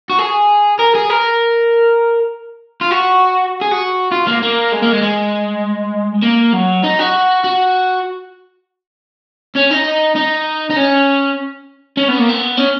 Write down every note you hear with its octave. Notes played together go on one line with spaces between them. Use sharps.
F#4
G#4
A#4
G#4
A#4
F4
F#4
G#4
F#4
F4
A#3
A#3
G#3
A#3
G#3
G#3
A#3
F#3
D#4
F#4
F#4
C#4
D#4
D#4
D#4
C#4
C#4
B3
A#3
B3
C#4